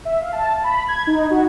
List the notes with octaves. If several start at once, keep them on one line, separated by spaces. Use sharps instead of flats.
E5
F5
A5
B5
G#6
D#4
F#4